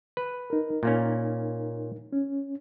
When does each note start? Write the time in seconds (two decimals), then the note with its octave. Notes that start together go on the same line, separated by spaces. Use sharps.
0.17 B4
0.50 D#4 A#4
0.83 A#2 A#3 C#4
2.13 C#4